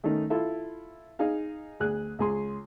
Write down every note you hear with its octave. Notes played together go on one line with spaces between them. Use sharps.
D#3 A3 C#4 D#4
E4 F4 A4 E5
D#4 G#4 F5
D2 G#4 F#6
C#2 G#4 C6